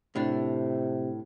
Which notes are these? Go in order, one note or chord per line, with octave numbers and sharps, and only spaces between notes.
A2 C3 D4